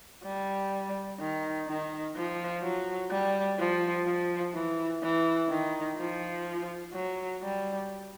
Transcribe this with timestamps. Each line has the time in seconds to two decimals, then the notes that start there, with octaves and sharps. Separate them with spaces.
0.24 G3
1.20 D#3
1.68 D#3
2.16 F3
2.63 F#3
3.11 G3
3.59 F3
4.07 F3
4.54 E3
5.03 E3
5.50 D#3
5.98 F3
6.93 F#3
7.42 G3